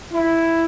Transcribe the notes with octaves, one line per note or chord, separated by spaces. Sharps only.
E4